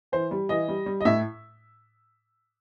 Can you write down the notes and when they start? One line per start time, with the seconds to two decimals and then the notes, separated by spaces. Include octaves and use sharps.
0.12 E3 C5
0.31 G3
0.49 E3 D#5
0.68 G3
0.86 G3
1.01 D#5
1.05 A2 E5